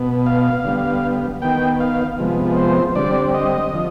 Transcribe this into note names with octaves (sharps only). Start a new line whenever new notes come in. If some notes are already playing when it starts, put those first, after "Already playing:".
Already playing: B2 B3
F5
D3 G3 B3
D#3 B3 G5
F5
C3 F3 G#3 B3
C5
D3 G3 C4 D5
D#5
D3 F3